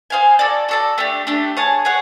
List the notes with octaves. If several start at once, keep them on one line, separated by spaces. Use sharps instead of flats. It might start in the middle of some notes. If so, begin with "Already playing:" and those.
G#4 C5 F5 G#5
F#4 A4 D5
F#4 A4 D5
A3 D4 G4
A3 D4 G4
G#4 C#5 F#5 A5
G#4 C#5 F#5